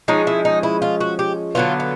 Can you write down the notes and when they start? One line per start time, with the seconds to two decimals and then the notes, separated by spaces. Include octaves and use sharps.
0.08 F3 G#3 C#4 D#4
0.27 E4
0.45 D#4
0.63 E4
0.82 F4
1.00 F#4
1.19 G4
1.55 D3 F#3 B3 F4
1.80 F4